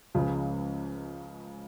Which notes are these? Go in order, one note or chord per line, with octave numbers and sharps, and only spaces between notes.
C#2 C#3 F3